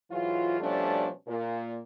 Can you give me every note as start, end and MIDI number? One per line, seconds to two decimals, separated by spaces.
0.10 0.57 44
0.10 0.57 52
0.10 0.57 54
0.10 0.57 65
0.60 1.09 47
0.60 1.09 53
0.60 1.09 55
0.60 1.09 57
0.60 1.09 61
0.60 1.09 62
1.28 1.80 46